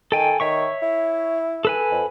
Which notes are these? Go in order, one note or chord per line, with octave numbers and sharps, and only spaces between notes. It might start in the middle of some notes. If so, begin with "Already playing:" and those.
D#3 A4 G5 G#5
D#3 C#5 E5 C#6
E4
A4 B4 G#5
F2